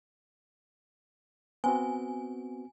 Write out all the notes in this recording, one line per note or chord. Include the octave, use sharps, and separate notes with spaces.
B3 C4 F#4 G#5